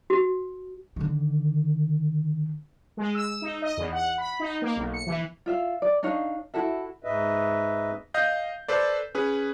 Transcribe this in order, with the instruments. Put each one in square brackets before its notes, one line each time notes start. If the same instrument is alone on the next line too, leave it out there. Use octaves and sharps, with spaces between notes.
[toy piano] F#4
[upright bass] D3 D#3
[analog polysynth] G#3
E6
D#4
D#5
E2
F#5
B5
D#4
A#3
B1
C#7
E3
[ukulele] F4 E5 F5
D5
D4 D#4 C#5 F5
E4 F#4 A4 E5
[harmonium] G#2 B4 D#5 E5
[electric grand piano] D#5 F5 G6
A4 B4 C5 D5
C#4 G#4 B4